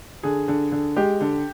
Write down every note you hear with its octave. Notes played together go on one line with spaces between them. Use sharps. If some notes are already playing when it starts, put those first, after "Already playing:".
D3 G#4
D3
D3
G#3 G4
D3